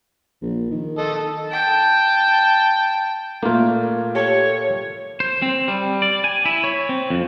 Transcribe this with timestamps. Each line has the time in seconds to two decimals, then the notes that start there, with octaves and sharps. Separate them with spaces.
0.42 A#1
0.70 D#3
0.98 A4 D#5
1.48 G5 A5
3.43 A#2 A3 A#3 F4
4.15 G4 A4 C#5
5.20 C5
5.42 C4
5.68 G3
6.02 D5
6.24 G#5
6.45 E4
6.64 C#5
6.89 C4
7.10 F2